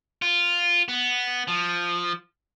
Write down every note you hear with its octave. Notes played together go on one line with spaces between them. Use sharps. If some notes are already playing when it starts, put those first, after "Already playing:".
F4
B3
F3